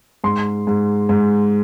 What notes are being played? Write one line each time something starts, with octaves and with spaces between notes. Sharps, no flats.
G#2 C6
G#2
G#2